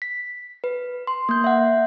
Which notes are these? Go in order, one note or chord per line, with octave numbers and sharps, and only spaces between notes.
B6
B4
C6
A#3 G6
E5 F#5